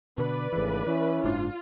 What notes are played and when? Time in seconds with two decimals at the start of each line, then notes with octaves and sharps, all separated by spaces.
0.18 B2 D3 B4 D5
0.52 G#1 G#2 C#3 E3 A3
0.87 E3 C#4 E4
1.24 F#1 G#2 D4 F4